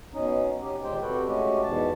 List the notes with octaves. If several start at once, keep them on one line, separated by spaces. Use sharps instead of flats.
B2 C#4 D#4
C#4 G4
D#2 A#2 G#3 G4 C5 G5
C3 F#4 A4 B4 G5
G#3 A3 C#4 F#4 G4
E2 G#2 B2 A5